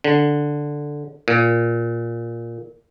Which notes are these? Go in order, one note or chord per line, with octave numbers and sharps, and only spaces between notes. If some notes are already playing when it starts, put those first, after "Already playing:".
D3
A#2